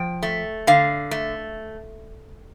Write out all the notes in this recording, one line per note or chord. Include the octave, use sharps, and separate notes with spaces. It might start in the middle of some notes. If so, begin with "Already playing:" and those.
Already playing: F3 G5
A3
D3 F5
A3